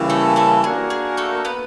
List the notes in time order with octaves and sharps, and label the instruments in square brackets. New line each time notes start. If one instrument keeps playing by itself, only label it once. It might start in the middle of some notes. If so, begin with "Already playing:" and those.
Already playing: [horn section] C#3 E3 G3 A#3 C#4
[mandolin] A3 A4
A3 A4
[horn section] A#3 D4 F#4 A#4 [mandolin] G#4
[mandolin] G#4
A3 A4
B3 B4